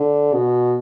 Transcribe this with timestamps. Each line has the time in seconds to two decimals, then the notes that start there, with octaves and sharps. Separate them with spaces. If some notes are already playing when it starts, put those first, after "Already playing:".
Already playing: D3
0.34 B2